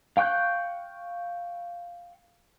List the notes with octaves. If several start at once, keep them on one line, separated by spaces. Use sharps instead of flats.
F5 G5 C#6 F#6 G6